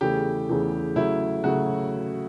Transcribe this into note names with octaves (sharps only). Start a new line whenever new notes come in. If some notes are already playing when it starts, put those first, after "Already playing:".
E2 C#3 E3 A3 G4
E2 C#3 E3 A3
C#3 F#3 A3 E4
C#3 F#3 A3 F#4